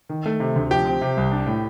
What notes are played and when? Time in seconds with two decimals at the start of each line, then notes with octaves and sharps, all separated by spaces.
0.09 D#3
0.26 A3
0.40 C3
0.56 D2
0.70 F3 G4
0.86 C4
1.01 C3
1.17 C2
1.31 D4
1.46 A2